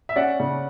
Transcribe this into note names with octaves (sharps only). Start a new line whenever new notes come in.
E5
C#4 D5 F#5
C#3